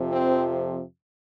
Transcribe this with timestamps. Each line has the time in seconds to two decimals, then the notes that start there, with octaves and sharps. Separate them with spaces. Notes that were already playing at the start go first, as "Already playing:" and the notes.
Already playing: F2 C3 F3
0.12 C4